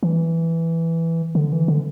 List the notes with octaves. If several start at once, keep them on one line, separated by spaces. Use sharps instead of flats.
E3
D3
E3
D3